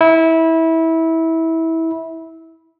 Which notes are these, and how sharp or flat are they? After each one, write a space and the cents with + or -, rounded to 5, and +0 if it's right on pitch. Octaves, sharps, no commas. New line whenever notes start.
E4 -20